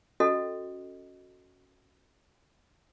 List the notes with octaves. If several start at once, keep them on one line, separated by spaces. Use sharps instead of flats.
C#4 F#4 A4 D#5